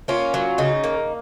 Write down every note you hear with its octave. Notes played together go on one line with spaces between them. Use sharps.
A#3 C#4 F4
F#3
C#3 D#4
A#3